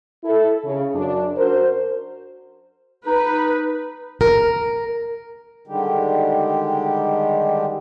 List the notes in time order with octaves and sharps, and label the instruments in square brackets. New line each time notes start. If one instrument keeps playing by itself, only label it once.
[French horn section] E4 A4
C#3
F#2 D4
F#4 A#4 C5
[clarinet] D#4 [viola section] B4
[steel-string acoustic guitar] A#4
[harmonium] D3 D#3 G3 G#3 G4